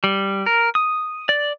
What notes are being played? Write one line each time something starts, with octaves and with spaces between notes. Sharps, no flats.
G3
A#4
D#6
D5